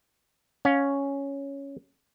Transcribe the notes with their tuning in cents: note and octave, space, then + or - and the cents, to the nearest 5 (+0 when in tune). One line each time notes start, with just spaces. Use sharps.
C#4 +0 F5 +30